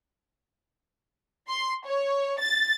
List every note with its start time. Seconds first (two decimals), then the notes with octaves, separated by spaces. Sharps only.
1.49 C6
1.85 C#5
2.40 A6